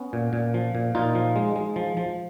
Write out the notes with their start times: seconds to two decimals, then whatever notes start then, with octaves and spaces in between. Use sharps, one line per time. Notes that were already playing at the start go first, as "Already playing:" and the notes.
Already playing: B3 C#4
0.13 A#2
0.33 A#2
0.54 F3
0.75 A#2
0.95 A#2 D#4 F4
1.15 F3
1.36 G#3
1.56 G#3
1.76 F3
1.97 F3